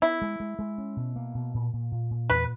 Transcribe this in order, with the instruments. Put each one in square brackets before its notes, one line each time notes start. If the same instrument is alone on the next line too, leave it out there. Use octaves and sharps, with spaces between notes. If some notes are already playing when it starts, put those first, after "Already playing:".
[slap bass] B3 [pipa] E4
[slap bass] G#3
G#3
G#3
C#4
B2
A#3
B2
A#2
A#2
A#2
A#2
[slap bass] E2 [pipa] B4